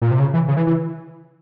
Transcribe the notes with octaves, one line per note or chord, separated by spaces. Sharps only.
A#2
C3
C#3
E3
C#3
E3
E3